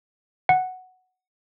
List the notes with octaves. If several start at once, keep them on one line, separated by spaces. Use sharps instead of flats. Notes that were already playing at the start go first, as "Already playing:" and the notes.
F#5